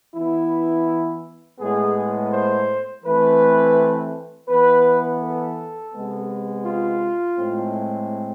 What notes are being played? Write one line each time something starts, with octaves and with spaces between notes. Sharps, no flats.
E3 B3 E4
A2 G#3 B3 G#4
C5
E3 A3 C4 B4
E3 B3 B4
A4
C3 G#3 B3
F4
A2 G#3 C4